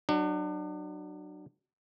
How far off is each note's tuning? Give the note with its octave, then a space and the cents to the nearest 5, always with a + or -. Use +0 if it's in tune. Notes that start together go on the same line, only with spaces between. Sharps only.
F#3 +20 D4 +35